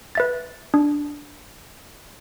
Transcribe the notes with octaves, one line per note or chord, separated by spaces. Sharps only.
B4 E5 A6
D4